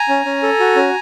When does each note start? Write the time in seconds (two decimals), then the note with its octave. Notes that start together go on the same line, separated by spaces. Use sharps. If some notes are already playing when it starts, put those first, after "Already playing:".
Already playing: G#5 A#5
0.09 C#4
0.25 C#4
0.43 A4
0.60 F#4
0.76 C#4